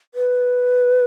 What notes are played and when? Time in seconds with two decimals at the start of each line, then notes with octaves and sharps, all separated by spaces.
0.14 B4